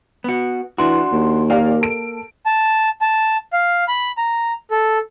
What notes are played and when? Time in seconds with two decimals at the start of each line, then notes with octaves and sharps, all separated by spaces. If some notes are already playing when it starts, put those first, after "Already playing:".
0.24 B3 F#4
0.78 E3 D4 F#4 C6
1.12 D#2
1.50 A#3 G4 D5 F5
1.81 A4 D7
2.46 A5
3.01 A5
3.53 F5
3.88 B5
4.17 A#5
4.71 A4